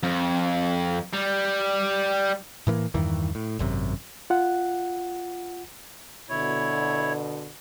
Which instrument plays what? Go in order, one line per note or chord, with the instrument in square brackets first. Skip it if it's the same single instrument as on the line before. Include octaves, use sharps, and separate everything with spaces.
[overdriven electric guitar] F2
G3
[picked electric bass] A2 E3 A3 A#3
E2 G2 D#3 E3
A2
G#1 F#2 C3
[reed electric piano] F4 F#5
[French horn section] B2 D3 [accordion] E4 C#5